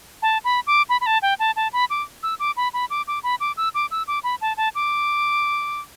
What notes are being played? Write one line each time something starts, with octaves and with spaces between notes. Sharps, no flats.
A5
B5
D6
B5
B5
A5
G5
A5
A5
B5
D6
E6
D6
B5
B5
D6
D6
B5
D6
E6
D6
E6
D6
B5
A5
A5
D6